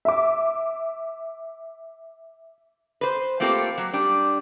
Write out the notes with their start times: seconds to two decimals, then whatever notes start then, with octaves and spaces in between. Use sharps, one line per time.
0.05 E5 D6
3.01 B4 C5
3.40 A3 A#3 C4 F4 G4 A4
3.78 F#3
3.93 G3 D4